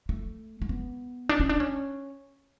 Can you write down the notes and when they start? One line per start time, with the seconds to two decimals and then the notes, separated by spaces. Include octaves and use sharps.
0.09 A3
0.62 A3
0.69 B3
1.29 D4
1.40 C#4
1.49 D4
1.60 C#4